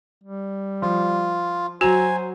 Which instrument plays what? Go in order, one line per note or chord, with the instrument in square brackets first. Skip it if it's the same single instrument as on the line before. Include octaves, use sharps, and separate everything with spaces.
[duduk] G3
[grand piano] F3 [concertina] F4
[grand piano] F#3 A#5 F7 [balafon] F#4 [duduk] C5 [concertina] G#5